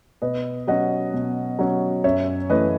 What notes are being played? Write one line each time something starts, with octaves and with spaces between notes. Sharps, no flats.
B2 B4 D#5
F#3 C#4 D#5 F#5
B2
F#3 C#4
F#2 C#5 E5
E3 A3 C#4 B4 D#5